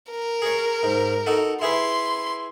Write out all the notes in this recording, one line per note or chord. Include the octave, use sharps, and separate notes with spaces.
A#4
G#4 C#5
G#2
D#4 F#4 A4
E4 G#4 B4 C6